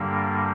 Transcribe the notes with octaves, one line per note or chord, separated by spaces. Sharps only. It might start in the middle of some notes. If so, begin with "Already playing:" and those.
Already playing: G2 D3 G3 A#3